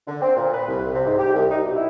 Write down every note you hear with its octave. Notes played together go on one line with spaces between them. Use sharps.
D3
C4
A#2
B4
C2
C3
G#2
G4
C2
D#4
B2
E4